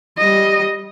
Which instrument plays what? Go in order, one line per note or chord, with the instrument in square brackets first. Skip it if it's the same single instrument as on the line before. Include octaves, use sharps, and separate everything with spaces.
[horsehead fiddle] G3 D#5